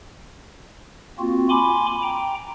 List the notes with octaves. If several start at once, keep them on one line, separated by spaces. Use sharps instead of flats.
A#3 C4 F4 F#4
G#5 B5 C6 D6
G5 A#5